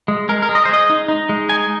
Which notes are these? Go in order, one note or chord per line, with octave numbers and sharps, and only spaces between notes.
G#3
G#3 A#4
A#4
G#3
D#5
C5
G#3 D#5
D#4
D#4
G#3
D#4 G#5